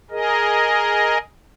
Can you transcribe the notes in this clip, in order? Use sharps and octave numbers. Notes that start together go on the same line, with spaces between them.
G#4 A#4 D#5